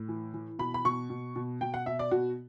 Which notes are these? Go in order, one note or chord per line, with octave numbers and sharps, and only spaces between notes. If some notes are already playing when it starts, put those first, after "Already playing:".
Already playing: A2
E3
E3
B2 B5
B5
B2 C#6
B2
B2
B2 G5
F#5
B2 E5
D5
B2 F#4